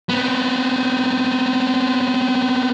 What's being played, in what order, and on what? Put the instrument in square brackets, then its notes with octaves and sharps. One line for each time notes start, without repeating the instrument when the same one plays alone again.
[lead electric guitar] B3 C4